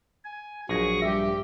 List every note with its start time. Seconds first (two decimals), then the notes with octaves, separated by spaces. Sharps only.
0.25 G#5
0.69 A#1 F#3 G#4 C#6 A#6
1.02 G2 G3 G4 E5